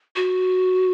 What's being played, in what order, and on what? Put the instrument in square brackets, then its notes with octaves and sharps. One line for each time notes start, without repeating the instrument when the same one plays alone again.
[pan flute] F#4